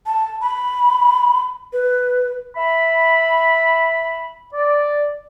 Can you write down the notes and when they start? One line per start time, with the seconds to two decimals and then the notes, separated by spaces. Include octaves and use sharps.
0.06 A5
0.41 B5
1.73 B4
2.56 E5 B5
4.54 D5